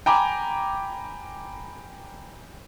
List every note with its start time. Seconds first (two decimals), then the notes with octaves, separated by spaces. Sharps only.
0.06 G5 G#5 A#5 B5 D6